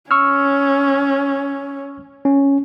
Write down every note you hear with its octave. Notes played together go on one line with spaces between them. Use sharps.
C#4 C#6 E6 F6
C#4